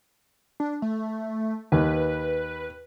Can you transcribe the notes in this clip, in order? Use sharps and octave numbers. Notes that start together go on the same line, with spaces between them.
D4
A3
D#2 B4